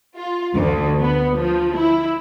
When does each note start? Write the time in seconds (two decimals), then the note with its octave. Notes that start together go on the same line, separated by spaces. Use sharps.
0.16 F4
0.55 D2
1.01 B3
1.38 F3
1.76 E4